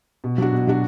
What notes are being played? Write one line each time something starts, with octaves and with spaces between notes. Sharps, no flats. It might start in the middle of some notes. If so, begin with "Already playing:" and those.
B2
F#3 D4 F#4
B2
F#3 D4 F#4